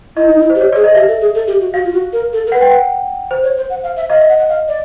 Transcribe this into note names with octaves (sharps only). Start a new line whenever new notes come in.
E4 D#5
D#4
E4
C5
G4
C#5
G#4 D5
D#5
G4 E5
A4
G#4
A4
G4
F#4
F#4 F5
F4
F#4
A#4
A4
A#4
B4 F#5
G5
F#5
C5
C#5
C5
F#5
F5
E5
D#5 F5
E5
F#5
F#5
F5
D5